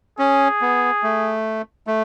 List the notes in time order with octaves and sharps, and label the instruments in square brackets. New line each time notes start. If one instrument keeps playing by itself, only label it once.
[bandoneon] C#4 [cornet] G#4
[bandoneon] B3
A3
A3